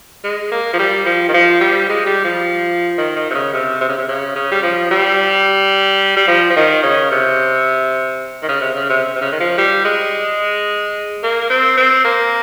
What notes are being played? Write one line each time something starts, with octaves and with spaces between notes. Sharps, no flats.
G#3
A#3
F3
G3
F3
D#3
F3
G3
G#3
G3
F3
D#3
D#3
C3
C#3
C3
C3
C#3
C3
C#3
C#3
G3
F3
G3
G3
F3
F3
D#3
C#3
C3
D#3
C#3
C3
C#3
C3
C3
C#3
D#3
F3
G3
G#3
A#3
C4
C4
A#3